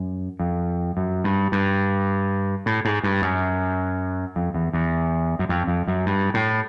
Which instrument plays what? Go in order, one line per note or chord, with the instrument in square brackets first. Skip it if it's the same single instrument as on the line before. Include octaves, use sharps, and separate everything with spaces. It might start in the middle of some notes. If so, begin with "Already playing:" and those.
Already playing: [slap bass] F#2
F2
F#2
G2
G2
A2
G#2
G2
F#2
F2
E2
E2
F#2
F2
F2
F#2
G2
A2